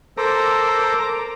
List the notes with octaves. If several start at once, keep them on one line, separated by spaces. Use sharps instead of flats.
A4 A#4 C5 A#5 D6